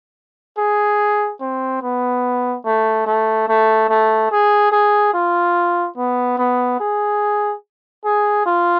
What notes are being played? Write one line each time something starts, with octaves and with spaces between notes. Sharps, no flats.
G#4
C4
B3
A3
A3
A3
A3
G#4
G#4
F4
B3
B3
G#4
G#4
F4